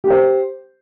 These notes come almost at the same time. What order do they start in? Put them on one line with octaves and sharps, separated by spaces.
G4 G5 C5